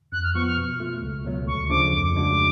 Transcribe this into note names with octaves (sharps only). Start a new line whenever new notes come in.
F2 F#6
F6
F3 B3 F4 C#6
F6
B2
A3 F4
C#2
B2 F#3 A3
D2 C#6
C#6
C#3 F3 A3 D4 D6
F2 D6
C#3 G#3 D4 F#4